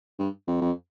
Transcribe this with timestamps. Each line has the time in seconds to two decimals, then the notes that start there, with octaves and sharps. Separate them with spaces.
0.19 G2
0.47 F2
0.61 F2